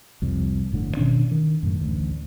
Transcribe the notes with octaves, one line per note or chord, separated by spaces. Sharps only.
C2 F2
G1 A2 D3
B2 D#3 C#4 D4
D#3
F#2 A2
A1 D2